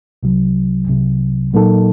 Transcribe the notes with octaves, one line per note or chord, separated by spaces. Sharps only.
C2 C3 F#3
C2 C3 F#3
A#2 F#3 A#3 D#4 A4